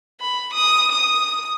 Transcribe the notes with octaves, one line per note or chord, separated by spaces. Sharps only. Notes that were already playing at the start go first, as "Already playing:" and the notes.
B5
D#6
D#6